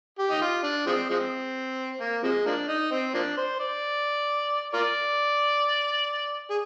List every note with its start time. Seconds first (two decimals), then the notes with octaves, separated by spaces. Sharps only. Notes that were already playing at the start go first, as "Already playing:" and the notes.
0.19 G4
0.30 D#4
0.41 F4
0.63 D4
0.86 F3 G#3 C4
1.10 F3 G#3 C4
2.00 A#3
2.23 C3 F3 G#3
2.46 F3 A#3 D4
2.68 D#4
2.91 C4
3.14 F3 A#3 D4
3.37 C5
3.59 D5
4.73 F4 A#4 D5
6.50 G#4